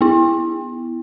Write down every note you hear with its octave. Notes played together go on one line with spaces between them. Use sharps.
B3 E4